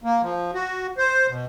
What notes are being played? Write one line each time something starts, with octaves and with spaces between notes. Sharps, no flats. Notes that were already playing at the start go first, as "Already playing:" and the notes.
A#3
F3
F#4
C5
B2